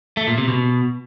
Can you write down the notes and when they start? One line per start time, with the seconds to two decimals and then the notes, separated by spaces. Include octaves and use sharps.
0.17 A3
0.27 A#2
0.38 C3
0.48 B2